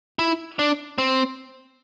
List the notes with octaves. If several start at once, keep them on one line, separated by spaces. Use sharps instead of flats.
E4
D4
C4